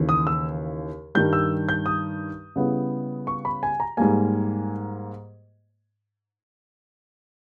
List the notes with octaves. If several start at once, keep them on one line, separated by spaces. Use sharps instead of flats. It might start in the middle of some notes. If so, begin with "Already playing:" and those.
Already playing: D#2 C#3 E3
D#6
E6
G2 D#3 G3 G6
E6
G6
D#6
C#3 G3 B3 E4
C#6
B5
G#5
A#5
G#2 G3 A#3 G#5